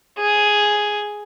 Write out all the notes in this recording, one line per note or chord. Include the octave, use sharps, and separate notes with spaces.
G#4